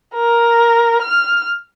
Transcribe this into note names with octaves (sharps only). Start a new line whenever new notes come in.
A#4
F6